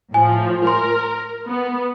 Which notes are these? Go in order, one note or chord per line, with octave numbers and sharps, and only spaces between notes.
A2 F3 G#5
A#4 C6
B3